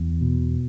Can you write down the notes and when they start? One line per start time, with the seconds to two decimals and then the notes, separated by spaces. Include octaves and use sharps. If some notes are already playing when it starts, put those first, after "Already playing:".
Already playing: E2
0.21 B2